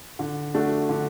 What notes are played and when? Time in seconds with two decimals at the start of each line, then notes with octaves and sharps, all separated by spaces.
0.19 D3
0.54 A3 D4 F#4
0.89 D3